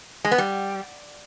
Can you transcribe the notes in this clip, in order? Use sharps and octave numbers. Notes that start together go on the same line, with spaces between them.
G#3
B3
G3